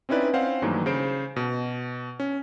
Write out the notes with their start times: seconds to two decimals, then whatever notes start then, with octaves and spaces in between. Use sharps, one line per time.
0.09 C4 C#4 D#4 E4 B4 D5
0.33 C4 C#4 C5 F5 F#5
0.62 G2 D#3 E3 F#3 A3 A#3
0.86 C#3 C5 D7
1.36 B2
2.20 C#4